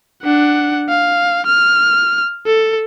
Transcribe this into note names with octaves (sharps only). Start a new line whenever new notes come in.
D4 F#5
F5
F6
A4